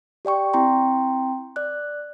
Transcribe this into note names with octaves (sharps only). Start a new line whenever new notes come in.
G4 D5 G5 C#6
C4 E4 G5 A#5 C6
D5 F#6